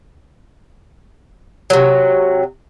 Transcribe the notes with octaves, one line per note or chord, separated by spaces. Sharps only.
C3 F#3